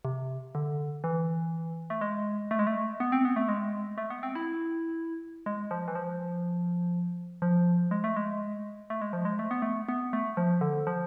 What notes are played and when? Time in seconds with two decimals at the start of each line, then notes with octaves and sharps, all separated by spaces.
0.05 C3
0.55 D3
1.04 E3
1.90 A3
2.01 G#3
2.51 A3
2.59 G#3
2.67 A3
3.00 B3
3.12 C4
3.25 B3
3.36 A3
3.48 G#3
3.98 A3
4.10 B3
4.23 C4
4.35 E4
5.46 G#3
5.71 F3
5.88 E3
5.95 F3
7.42 F3
7.91 G#3
8.04 A3
8.16 G#3
8.90 A3
9.01 G#3
9.13 F3
9.25 G#3
9.39 A3
9.51 B3
9.62 A3
9.89 B3
10.13 A3
10.37 F3
10.61 D3
10.87 F3